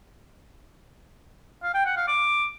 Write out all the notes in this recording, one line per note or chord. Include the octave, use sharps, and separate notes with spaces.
F5
G5
F#5
F5
D6